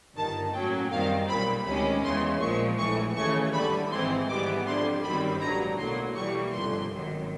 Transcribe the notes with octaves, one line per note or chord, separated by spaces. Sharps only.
G1 G2 D#3 A5
A2 F#3 A#3 C#4 G5
F#2 D#3 G3 C4 F5
B1 A#2 G3 B5
D2 C3 D#3 G#3 C#4 B5
E2 C#3 E3 G#3 C6
A#1 A#2 F3 G#3 C#6
A#1 A2 E3 C#6
D#2 C#3 E3 A3 C#6
D#2 D3 G3 B5
G#1 G#2 E3 G#3 C4 C6
G#1 G#2 E3 G3 B3 D6
F2 D3 G3 C6
G1 F#2 D#3 G3 C4 B5
A1 G2 D3 F#3 A#5
B1 A2 F#3 A#3 C6
A2 E3 G3 A#3 C#6
G1 F2 C3 C6
G#1 F#2 D#3 F#3